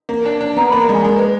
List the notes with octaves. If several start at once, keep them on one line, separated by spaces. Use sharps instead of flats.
A#3
D4
D4
B3 A#5
A#3 B5
A#5
G#3 G#5
G#3 A#4
B4